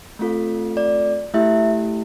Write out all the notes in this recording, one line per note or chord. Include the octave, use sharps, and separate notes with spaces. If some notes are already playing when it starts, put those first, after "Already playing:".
A3 C4 F4 A4
D5
A3 E4 G4 E5